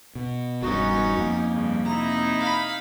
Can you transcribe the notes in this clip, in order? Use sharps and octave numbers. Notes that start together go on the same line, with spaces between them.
B2
E1 G2 B3 C#4 D#4 F#4
F2 A#3
G2 C#3
C3 D#4 E4 A#5
F5 B5